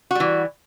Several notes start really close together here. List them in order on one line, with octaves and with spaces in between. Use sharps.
F#4 G3 E3